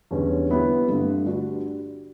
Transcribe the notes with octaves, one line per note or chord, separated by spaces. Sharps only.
E2 D3 G3 C#4
G3 B3 E4 G4
G2 D3 A3
G3 D4 F#4